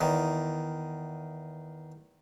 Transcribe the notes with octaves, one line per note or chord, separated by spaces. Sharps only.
E2 D#3